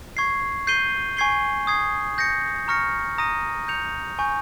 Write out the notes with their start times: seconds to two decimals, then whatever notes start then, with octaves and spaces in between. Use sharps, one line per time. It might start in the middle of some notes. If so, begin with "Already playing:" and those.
0.17 C#6 G#6 C7
0.67 G6 C7 D#7 G7
1.17 G#5 C#6 G#6 C7 G7
1.67 D#6 G#6 C7
2.18 G6 A#6 C#7
2.68 A#5 C#6 F6 A#6 C#7
3.18 A#5 D#6 A#6 D#7
3.68 G6 C#7 F7
4.19 G#5 C#6 G6